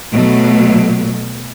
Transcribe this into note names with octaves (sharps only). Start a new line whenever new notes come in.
B2 F#3 A3